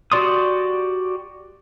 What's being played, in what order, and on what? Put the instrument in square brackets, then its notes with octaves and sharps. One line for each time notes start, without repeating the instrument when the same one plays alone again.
[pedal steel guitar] F#4 G4 D5 C6 D#6